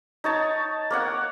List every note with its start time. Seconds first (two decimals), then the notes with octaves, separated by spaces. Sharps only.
0.24 D#4 C#5 A5
0.90 A#3 C#5 F#5